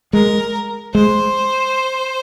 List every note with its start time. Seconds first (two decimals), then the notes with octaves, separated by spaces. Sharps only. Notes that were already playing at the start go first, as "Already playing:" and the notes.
0.13 G#3 A#4
0.94 G#3 C5